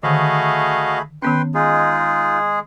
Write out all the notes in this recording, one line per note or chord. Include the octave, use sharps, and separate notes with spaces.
D3 D#3 A3 F#4 G#4 D#5 F5 B5
D#3 B3 C#4 B4 G5 C6
G#3 D#4 F4 G#4